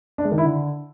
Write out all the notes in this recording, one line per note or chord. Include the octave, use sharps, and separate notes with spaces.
D4
G#3
D#3
E4
D3